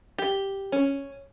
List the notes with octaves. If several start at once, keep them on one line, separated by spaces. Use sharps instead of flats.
G4
C#4